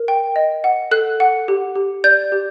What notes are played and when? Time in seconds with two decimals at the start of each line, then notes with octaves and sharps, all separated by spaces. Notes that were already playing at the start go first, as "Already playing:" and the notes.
Already playing: A#4
0.08 G5
0.36 D#5
0.64 F#5
0.91 A4 F#6
1.20 F#5
1.48 G4
1.75 G4
2.04 D5 G6
2.32 G4